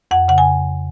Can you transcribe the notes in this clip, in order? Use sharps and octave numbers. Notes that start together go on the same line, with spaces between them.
F2 F#5
C#3 F#5
G#5